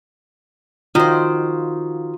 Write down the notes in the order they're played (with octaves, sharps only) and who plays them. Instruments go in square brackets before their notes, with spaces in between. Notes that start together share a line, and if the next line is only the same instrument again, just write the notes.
[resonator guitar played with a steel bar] D#3 C5 [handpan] F4 F#4